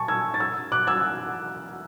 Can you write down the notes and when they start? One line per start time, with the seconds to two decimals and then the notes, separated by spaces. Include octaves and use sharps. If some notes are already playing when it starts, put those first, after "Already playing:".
Already playing: G#5 A5 C#6
0.08 E6 G#6
0.34 A6
0.40 E6 G#6
0.72 D6 F#6
0.87 E6 G#6